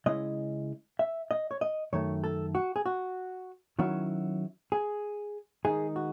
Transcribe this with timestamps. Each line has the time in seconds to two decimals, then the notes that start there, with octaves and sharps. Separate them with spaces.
0.06 C#3 G#3 C#4 E4 D#5
0.99 E5
1.31 D#5
1.51 C#5
1.61 D#5
1.93 F#2 D#3 A3 C#5
2.24 A4
2.55 F#4
2.76 G#4
2.86 F#4
3.79 D#3 F#3 C#4 E4 F#4
4.72 G#4
5.65 D#3 G#3 D#4 G#4
5.96 F#4